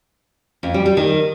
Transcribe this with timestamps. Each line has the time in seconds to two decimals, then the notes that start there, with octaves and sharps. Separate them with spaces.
0.63 F2
0.74 G3
0.86 G3
0.97 D#3